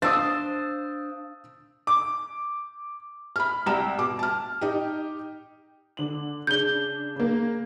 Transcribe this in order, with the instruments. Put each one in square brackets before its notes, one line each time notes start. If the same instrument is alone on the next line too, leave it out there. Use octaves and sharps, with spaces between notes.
[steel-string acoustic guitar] D4 C5 F5 [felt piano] D#6 E6 A6
[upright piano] D6
[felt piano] B5 F6
C2 G5 A#5 E7
B2 D6
A5 F6
D#4 G4
[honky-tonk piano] D3 F#7
[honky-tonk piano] C#3 D4 [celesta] G6 G7
[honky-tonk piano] C#3 A#3